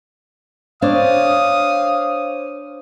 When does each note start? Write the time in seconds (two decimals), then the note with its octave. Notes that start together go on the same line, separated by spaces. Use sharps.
0.82 D4 C5 C#5 F5 D6 D#6